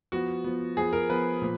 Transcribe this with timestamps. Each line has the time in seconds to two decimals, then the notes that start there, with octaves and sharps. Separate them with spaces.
0.12 F3 B3 F#4
0.44 F3 B3
0.77 F3 B3 G#4
0.93 A#4
1.09 F3 B3 B4
1.42 A#2 F3